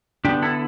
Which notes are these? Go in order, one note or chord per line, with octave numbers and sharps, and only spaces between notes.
D3 B3 D4 G4
E4 A4